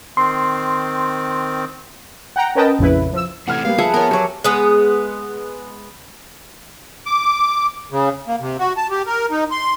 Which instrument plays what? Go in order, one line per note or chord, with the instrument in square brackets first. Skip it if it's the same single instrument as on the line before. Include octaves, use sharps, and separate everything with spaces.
[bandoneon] D#3 C4 [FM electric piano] C6
[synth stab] F#5 G5 A#5
C#4 A#4 B4 D#5 G5 A5
A#1 F2 C#3 E4 B4
F3 E6
[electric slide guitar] C3 E3 A3 [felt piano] F#5 F6 G#6
[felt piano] G3 A#3 B3 [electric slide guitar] F5
[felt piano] F3 [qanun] G#4 E5 F#5 [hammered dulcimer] A4 B4
[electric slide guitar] B3 F#5 [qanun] A#4 C#5
[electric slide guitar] F#3 [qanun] G4 C#5
[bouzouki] G#3 B3 B4
[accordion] D6
C#3
A#3
C3
F#4
A5
G4
A#4
D#4
C6